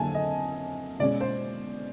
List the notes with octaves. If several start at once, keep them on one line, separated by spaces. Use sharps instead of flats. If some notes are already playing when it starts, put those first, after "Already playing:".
Already playing: F2 D3 F#3 A#3 G#5 A5
D#5
B2 G#3 C#4 D5
C5